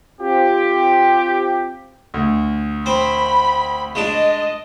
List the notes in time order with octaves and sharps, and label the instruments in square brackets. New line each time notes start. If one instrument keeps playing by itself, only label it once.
[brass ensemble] C4 F4 G4
[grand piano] D2
[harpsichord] C4 [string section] B5
[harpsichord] G#3 D4 [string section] D#5